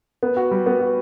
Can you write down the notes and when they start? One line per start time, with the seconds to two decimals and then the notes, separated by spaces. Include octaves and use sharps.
0.23 B3
0.37 F#4
0.51 G3
0.66 B3
0.80 F#4